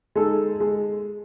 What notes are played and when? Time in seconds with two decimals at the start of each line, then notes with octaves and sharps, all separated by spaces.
0.16 G#3 D#4 A4
0.60 G#3